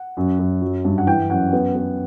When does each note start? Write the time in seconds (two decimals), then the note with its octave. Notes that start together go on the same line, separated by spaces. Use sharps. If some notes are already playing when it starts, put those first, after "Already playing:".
Already playing: F#5
0.17 F#2
0.39 F#2
0.61 F#3
0.84 G2
0.98 F#5
1.07 E3 G5
1.29 F#2 F#5
1.53 B3
1.75 B3